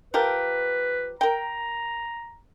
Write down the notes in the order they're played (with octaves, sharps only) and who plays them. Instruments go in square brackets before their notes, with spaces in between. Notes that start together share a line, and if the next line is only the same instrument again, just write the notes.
[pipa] F3 G4 A#4 [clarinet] B4
[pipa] A#4 G5 [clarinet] A#5